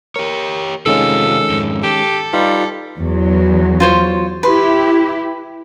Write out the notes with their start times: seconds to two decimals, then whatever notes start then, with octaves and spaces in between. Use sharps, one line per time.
0.16 G4 A#4 C#5
0.86 C3 D#3 G#3 C#4 F4 A4
1.50 F2 G#2
1.83 G4 A4
2.33 G3 D#4 F4 B4
2.99 E2 F#3
3.80 F4 C5 C#5
4.43 E4 G4 B4 C6